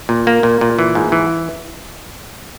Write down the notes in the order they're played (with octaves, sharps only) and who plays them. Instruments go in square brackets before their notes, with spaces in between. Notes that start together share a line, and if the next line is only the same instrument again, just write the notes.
[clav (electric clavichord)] A#2
A#3
A#2
A#2
E3
G#2
E3